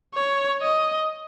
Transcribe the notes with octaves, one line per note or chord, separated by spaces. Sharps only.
C#5
D#5